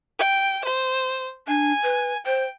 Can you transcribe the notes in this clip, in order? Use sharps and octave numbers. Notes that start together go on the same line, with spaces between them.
G5
C5
D4 G#5
B4
C5 G5